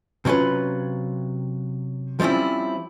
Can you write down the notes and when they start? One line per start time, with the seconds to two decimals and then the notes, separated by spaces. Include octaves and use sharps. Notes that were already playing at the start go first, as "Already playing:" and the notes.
0.25 C3 F#3 C#4 F4 B4
2.20 F3 G3 C4 C#4 E4